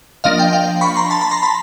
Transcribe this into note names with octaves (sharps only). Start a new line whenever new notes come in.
F3 A#3 D4 D#5 F5
F5 G5
F5 G5
B5 C#6
A#5 C6
A5 B5
A5 B5
A#5 C6
A5 B5